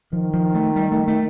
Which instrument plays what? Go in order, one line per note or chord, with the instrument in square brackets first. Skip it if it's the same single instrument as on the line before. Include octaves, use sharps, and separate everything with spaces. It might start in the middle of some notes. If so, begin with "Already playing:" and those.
[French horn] D#3 [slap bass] F3
[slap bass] F3
A3
G3
A3
A3